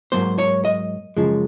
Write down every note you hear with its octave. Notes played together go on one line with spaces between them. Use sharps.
G#2 F#3 A#3 C5
C#5
D#5
F#2 C#3 F3 G#3